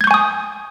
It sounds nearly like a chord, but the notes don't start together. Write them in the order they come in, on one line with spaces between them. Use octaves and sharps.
G#6 G6 C#6 G#5 D#6